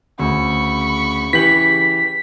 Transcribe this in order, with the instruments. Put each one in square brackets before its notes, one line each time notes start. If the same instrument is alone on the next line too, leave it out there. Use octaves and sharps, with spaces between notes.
[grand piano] D2 [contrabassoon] C#3 [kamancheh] B5 C#6
[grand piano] E3 G4 F#7 [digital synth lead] B6